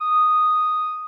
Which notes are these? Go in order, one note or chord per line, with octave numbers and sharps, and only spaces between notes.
D#6